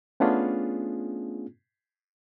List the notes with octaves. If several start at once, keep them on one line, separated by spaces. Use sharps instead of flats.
A3 B3 C#4 D4 F4 G#4